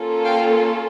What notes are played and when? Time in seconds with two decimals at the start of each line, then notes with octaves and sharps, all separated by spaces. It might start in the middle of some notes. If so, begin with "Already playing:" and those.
Already playing: A#3 C#4 F4 A4
0.25 F5 G5